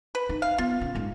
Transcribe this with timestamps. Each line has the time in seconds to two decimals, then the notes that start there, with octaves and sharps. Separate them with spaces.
0.15 B4
0.29 D#4
0.42 F5
0.58 B3 F4
0.81 C#3
0.95 F#1 G#2